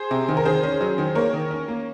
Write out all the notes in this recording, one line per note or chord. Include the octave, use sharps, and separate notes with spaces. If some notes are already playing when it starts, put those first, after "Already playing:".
Already playing: G#4 C5
C3
D#3
A#4
D#3 G#4 C5
C#4
F#3
D#3
A#3 A#4 C#5
D#3
C#4
A#3